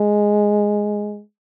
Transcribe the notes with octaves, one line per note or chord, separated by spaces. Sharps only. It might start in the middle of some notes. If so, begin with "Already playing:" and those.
Already playing: G#3